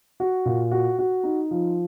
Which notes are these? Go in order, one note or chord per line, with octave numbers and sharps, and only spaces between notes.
F#4
A#2
F#4
F#4
D#4
F3